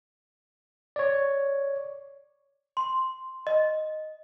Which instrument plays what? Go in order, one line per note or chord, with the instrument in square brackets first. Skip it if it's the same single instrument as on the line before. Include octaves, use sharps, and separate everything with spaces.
[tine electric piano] C#5 D5
[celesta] C6
D#5